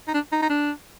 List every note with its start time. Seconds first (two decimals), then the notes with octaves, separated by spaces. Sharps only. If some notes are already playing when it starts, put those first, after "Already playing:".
0.08 D#4
0.14 D4
0.32 D#4
0.42 D#4
0.49 D4